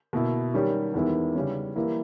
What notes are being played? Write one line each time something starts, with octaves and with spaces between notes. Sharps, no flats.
B2 A#3 E4
D#3 G3 C#4 G4
E2 D#3 G#3 B3 E4
C#3 G3 C#4
E3 G3 A#3 E4